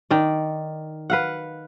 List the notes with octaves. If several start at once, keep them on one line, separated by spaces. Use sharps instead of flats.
D#3 D5
B4 F5 F#5